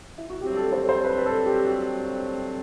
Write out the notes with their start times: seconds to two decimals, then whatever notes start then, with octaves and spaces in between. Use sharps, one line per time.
0.18 E4
0.30 F#4
0.41 G2 F#3 A3 C4 G4
0.56 A4
0.72 C5
0.89 C5
1.04 B4
1.18 B4
1.26 A4
1.46 G4
1.67 F#4